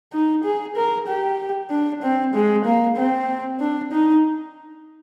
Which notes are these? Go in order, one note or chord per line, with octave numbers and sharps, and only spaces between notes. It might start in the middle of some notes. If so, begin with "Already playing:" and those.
D#4
G#4
A#4
G4
D4
C4
G#3
A#3
C4
D4
D#4